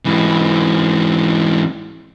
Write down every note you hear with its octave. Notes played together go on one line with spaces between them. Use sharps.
G#2 E3